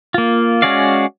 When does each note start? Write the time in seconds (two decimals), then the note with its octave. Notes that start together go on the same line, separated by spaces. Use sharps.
0.14 A#3 F4
0.62 G#3 C#4 F#4 D5 F5